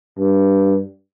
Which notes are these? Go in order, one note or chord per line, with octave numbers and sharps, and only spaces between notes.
G2